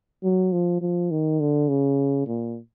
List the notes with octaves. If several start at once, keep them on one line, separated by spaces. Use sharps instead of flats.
F#3
F3
F3
D#3
D3
C#3
A#2